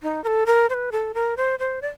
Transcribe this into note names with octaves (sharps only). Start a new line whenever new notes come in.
D#4
A#4
A4
A#4
C5
B4
A4
A#4
C5
C5
D5